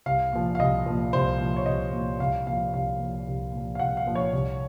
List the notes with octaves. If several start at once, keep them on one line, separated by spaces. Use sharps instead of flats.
C2 F5
A#2 F3
F5
C2 D#5
A#2 F3
C2 C5
A#2 F3
C#5
C2 D#5
A#2 F3
C2 F5
A#2 F3 F5
C2 F5
A#2 F3
C2
A#2 F3
F5
C2 F#5
F5
A#2 F3
C#5
C2